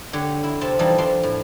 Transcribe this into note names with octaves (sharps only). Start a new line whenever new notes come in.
D3 G4 C#5
E4
C3 C4 A5
E3 F3 G3 D4 D#4 A4
F3 C4 D4 C6
A2